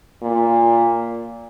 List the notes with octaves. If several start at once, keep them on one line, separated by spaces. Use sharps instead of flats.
A#2